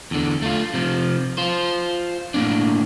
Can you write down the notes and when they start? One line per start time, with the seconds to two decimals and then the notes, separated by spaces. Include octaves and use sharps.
0.11 E2 D3
0.42 A3 F4
0.74 C3 F3
1.38 F4 C5
2.34 A2 A#3 C#4 D4